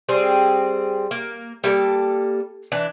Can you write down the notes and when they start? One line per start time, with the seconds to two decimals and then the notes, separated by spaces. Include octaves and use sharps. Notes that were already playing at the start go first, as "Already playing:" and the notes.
0.09 G3 C4 G#4
1.11 A#3
1.64 G3 A#3 A4
2.72 E3 D4